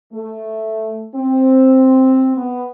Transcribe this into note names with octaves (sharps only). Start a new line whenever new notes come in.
A3
C4
B3